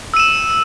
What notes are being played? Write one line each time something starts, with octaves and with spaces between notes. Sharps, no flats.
E6 D#7 E7